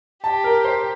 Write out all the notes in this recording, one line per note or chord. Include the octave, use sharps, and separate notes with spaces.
G4 A5
A#4
C5